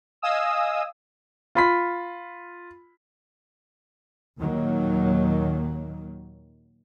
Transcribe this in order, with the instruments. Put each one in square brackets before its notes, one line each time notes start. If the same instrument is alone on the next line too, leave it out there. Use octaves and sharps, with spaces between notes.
[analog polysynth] D#5 F5 G#5 D#6 E6
[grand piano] F4 B5 B6
[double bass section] D#2 A#2 D#3 F#3 A#3